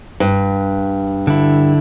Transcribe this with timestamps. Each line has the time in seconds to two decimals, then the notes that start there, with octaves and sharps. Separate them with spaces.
0.20 G2
1.27 D3 E4